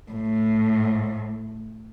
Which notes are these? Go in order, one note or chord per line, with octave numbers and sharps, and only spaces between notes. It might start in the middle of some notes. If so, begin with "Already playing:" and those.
A2